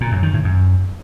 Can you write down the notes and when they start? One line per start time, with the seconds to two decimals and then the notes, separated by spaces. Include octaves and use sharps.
0.01 A#2
0.12 F#2
0.23 D#3
0.33 A2
0.44 F#2